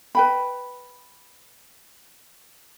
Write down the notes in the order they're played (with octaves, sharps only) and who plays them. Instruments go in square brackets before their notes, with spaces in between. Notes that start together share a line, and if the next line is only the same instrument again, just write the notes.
[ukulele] B4 G5 B5